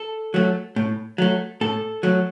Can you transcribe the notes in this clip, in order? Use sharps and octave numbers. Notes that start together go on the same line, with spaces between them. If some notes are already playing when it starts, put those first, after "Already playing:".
Already playing: A4
F#3 A3
A2
F#3 A3
A2 A4
F#3 A3